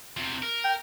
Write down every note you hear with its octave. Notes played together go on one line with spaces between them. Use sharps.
E2 C3
A#4
G5